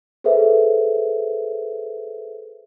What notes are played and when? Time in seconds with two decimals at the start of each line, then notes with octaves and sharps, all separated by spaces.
0.24 G#4 A4 B4 C5 E5